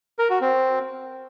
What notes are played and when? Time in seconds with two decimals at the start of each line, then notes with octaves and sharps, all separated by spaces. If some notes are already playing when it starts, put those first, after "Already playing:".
0.19 A#4
0.30 F#4
0.41 C4